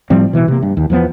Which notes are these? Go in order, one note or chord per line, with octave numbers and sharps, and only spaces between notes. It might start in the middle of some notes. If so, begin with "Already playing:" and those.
A2 F3 G3 C4
B2 E3
C3 A#3
G2
D#2
E2 F3 B3